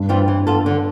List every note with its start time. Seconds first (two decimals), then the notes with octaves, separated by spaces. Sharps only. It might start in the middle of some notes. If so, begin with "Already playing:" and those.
Already playing: G2
0.09 E3 G3 C4 F4
0.28 E3
0.47 B3 F4 A4
0.66 D3